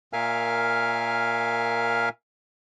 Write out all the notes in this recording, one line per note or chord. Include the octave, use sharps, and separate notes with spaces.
A#2 A#4 E5 F5 G#5 F6